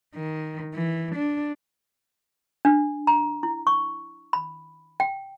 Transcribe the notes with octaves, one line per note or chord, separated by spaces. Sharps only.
D#3
E3
D4
D4
A#5
E4
C#6
B5
G5